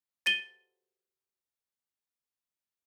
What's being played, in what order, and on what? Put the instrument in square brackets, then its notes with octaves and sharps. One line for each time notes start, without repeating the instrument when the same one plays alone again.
[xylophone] A6 D#7 G7